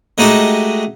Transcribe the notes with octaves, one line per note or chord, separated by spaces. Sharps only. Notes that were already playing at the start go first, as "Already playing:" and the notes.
G#3 A3 D#4 F#4 G4